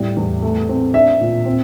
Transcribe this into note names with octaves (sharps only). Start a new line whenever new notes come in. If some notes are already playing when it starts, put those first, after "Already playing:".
Already playing: A2 G3
E2
A3
C4
D4 E5
A#2
C4